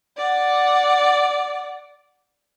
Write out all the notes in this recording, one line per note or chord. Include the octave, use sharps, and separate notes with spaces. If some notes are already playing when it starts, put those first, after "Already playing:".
D5 F#5